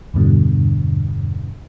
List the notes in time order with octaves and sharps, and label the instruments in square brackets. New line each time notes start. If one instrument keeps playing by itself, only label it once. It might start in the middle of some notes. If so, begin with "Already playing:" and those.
[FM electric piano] E2 G2 B2 D3